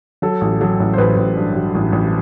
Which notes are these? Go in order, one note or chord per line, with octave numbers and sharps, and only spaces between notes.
F#3 A4
A1
F#3 A4
A1
C5
A1 B4
A1
G2
F#3
A1
A1